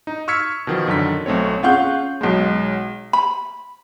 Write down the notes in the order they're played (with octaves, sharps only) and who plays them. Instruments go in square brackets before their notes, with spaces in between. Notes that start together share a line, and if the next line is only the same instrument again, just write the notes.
[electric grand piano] D#4
C#6 E6 F6 G#6 B6 C#7
B2 D#3 F3
F#2 D3 D#3 B6
B1 A3 C4 C#5
[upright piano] C#4 F4 G#4 F#5 C#6 G6
B1 G#3
[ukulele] B5